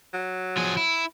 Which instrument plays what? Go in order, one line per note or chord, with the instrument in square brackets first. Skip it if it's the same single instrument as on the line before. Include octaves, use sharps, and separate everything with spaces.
[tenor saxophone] F#3
[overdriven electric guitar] F3 G#4
E4